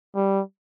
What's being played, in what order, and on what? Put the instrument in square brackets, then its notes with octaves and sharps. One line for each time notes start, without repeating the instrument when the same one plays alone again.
[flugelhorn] G3